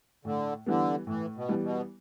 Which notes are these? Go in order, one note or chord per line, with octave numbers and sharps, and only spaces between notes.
A2 D3
D3 E3 G3 B3
A2 E3
B2
E3 G3 B3
B2